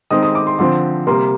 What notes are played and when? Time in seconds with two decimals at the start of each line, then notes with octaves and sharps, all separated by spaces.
0.11 D#3 G#3 C4 D#6
0.23 D#6
0.35 D6
0.47 C6
0.59 D3 F3 C4 C6
1.07 C3 G3 A#3 C6